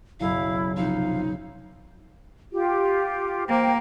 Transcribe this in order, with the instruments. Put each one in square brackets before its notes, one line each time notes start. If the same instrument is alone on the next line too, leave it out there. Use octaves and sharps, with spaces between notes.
[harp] F#1 B1 [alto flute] E4 [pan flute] F5
[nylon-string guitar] C3 F3 [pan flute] D#4 [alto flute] F5
[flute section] F4 G4
[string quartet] A#3 [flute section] C5 G5